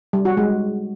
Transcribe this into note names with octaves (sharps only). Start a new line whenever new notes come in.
G3
F#4
G#3